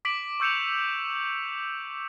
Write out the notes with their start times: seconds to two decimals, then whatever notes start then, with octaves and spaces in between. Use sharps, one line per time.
0.05 D6 B6 D7 F#7
0.40 C#6 E6 G6 C#7 E7 F7